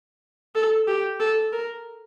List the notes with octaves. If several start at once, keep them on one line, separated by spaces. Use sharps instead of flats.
A4
G4
A4
A#4